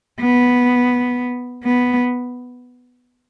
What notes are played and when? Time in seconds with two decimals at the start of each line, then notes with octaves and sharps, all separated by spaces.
0.21 B3
1.64 B3